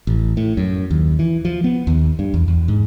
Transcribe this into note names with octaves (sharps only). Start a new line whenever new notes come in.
A1
A2
F#2
D#2
E3
F3
B3
D#2
G2
E2
E2
G#2